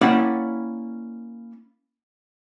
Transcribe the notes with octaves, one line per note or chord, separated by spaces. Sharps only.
A#3 C#4 E4 D5 F#5 G5